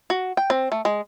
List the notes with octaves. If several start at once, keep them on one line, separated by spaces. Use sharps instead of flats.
F#4
G5
C4
A3
G#3